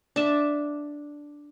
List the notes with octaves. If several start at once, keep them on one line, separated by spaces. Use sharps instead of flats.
D4 E5